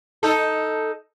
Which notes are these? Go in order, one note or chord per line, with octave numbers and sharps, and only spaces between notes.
D#4 A4